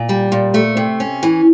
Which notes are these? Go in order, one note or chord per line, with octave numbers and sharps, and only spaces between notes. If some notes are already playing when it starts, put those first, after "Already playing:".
Already playing: A#2
G3
A#2
A3
C3
C#4
E3